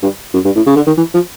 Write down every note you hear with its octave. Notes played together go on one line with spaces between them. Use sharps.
G2
F#2
G2
A2
C#3
D3
D#3
E3
F3